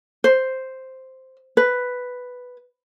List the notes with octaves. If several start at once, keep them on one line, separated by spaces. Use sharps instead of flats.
C5
B4